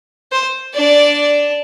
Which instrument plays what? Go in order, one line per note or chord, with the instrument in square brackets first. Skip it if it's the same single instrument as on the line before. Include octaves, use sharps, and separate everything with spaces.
[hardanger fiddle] C5
[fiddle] D4 [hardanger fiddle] D5